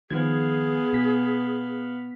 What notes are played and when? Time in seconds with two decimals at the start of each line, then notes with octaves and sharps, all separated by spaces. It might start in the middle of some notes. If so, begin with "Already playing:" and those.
0.10 D#3 F3 B3 G#4 F5 G#6
0.93 B2 B6